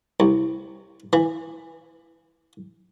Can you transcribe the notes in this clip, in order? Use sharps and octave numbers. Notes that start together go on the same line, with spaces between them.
C2
E3